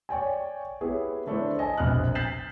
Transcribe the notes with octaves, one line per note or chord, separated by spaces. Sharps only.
C#5 D5 G5 G#5
B3 E4 G4 G#4 C#5
D3 A3 D4 E4 A4 C5
D#5 G#5 A5
E1 A#1 C3 D#6 F6 F#6
G6 A6 B6 C7 E7 F#7